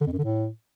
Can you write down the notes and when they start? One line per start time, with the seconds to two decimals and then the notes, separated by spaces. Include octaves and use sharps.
0.01 D3
0.07 F2
0.12 F#2
0.18 D3
0.24 A2